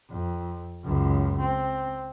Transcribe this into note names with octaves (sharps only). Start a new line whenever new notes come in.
F2
C#2 F#2
C4